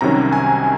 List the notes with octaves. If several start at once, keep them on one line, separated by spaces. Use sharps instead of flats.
C2 C3 D#3 F#3 C#4 A#5
G#5